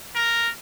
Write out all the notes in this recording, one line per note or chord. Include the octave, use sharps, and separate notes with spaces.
A#4